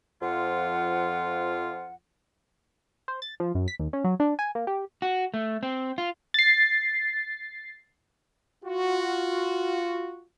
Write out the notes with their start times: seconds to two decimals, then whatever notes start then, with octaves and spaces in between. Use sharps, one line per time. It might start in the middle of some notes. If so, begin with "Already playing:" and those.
0.22 F2 F3 F4 F#5
3.08 C5
3.22 A6
3.40 F3
3.55 F#2
3.68 B6
3.80 D#2
3.93 C#4
4.04 F#3
4.20 D4
4.39 G#5
4.55 A#3
4.67 G4
5.02 F#4
5.34 A3
5.63 C4
5.98 F4
6.34 A6 C7
8.64 F4 F#4